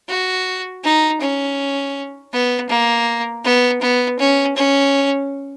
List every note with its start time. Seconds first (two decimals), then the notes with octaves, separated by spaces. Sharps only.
0.08 F#4
0.84 D#4
1.21 C#4
2.33 B3
2.69 A#3
3.44 B3
3.81 B3
4.19 C#4
4.56 C#4